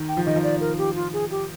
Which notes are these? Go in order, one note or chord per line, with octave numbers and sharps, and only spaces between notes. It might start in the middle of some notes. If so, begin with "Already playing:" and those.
Already playing: D#3
G5
F3
D#3 D#5
F3
D5
A#4
G4
F4
G#4
G4